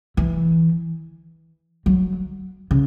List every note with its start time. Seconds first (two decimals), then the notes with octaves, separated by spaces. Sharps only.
0.17 E3
1.86 F#3
2.71 C#3